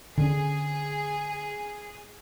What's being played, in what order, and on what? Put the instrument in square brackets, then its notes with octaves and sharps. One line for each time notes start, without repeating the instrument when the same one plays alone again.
[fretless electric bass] D3 C#4 [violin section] G#4